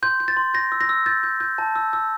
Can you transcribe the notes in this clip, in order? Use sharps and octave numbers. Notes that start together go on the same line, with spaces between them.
C6 G6
G6
A6
C6
G6 A#6
E6
A#6
E6
G6 A6
G6
G6
A5
E6
E6